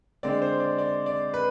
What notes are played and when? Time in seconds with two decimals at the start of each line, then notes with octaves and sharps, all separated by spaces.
0.23 D3 G#3 C4 D5
0.42 C5
0.60 D5
0.78 D5
1.06 D5
1.34 B4